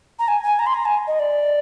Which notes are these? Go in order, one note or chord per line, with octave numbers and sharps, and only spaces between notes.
A#5
G#5
G#5
A#5
C6
A#5
G#5
D#5
D5